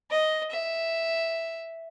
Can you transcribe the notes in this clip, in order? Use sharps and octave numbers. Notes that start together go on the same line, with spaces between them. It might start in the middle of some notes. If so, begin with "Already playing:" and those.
D#5
E5